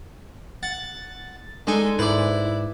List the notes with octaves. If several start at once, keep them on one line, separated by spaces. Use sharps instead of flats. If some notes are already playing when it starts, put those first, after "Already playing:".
F#5 A6
G#3 D4 D#4 A4 G#5
G#2 E4 B4 D5